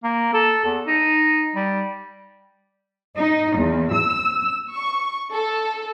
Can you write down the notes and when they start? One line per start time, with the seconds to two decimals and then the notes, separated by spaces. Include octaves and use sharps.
0.03 A#3
0.34 A4
0.65 E2
0.87 D#4
1.55 G3
3.18 D#4
3.58 E2
3.93 E6
4.75 C#6
5.33 A4